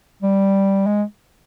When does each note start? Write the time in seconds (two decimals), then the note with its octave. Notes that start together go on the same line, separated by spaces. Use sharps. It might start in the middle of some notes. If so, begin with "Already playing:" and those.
0.22 G3
0.86 G#3